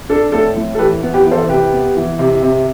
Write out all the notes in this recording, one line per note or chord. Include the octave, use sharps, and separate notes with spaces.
D4 A4
A2 A4
A2
A4
E3 G4 B4
B3
G4 B4
E3
A4 C5
C3 G4 B4
B3
E3
C3
C3